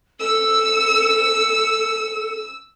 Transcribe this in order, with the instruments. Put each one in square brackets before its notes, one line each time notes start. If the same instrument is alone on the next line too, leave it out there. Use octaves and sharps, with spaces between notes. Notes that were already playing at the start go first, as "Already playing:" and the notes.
[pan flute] A4 [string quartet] E6